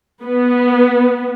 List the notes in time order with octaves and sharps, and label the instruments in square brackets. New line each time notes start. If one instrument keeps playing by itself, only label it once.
[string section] B3